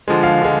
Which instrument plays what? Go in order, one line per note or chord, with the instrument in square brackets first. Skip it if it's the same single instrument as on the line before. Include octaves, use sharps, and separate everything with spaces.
[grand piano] D3 F3 G#3
F5
D3 G#3